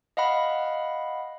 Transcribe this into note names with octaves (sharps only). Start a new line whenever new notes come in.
D#5 F5 F#5 B5